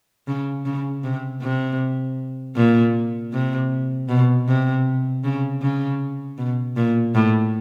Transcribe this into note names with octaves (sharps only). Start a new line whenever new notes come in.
C#3
C#3
C3
C3
A#2
C3
B2
C3
C#3
C#3
B2
A#2
A2